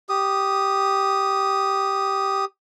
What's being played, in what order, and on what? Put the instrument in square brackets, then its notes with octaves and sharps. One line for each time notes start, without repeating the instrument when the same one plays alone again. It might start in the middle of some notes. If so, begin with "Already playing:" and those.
[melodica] G4 D#6